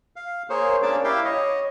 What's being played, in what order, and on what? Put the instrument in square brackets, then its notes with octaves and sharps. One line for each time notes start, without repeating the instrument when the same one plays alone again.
[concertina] F5
A#3 G#4 C5 C#5
A#3 C#4 D4 A5 D6
E4 G4 F5 G5
C#5 D#5